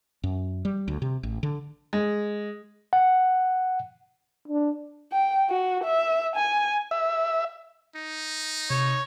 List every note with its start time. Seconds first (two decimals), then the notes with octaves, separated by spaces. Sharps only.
0.24 F#2
0.65 G3
0.88 D2
1.02 C3
1.23 A1
1.43 D3
1.93 G#3
2.93 F#5
4.48 D4
5.12 G5
5.50 F#4
5.84 E5
6.36 G#5
6.91 E5
7.96 D#4
8.70 C3 C#5